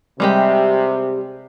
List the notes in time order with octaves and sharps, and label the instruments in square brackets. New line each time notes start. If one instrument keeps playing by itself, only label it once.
[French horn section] C3 [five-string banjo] G3 G#3 G4